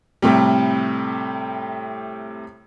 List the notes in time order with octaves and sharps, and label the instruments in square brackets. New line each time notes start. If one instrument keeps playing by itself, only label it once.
[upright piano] A2 C3 G3